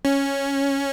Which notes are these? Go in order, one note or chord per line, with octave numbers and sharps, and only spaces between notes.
C#4